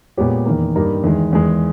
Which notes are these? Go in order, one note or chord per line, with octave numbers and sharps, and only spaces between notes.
A#2 G#3 B3 G4 C#5
E2 D#3 A#3
G2 G3 A#3 D#4 A#4
E2 D#3 G#3
E2 D#3 G#3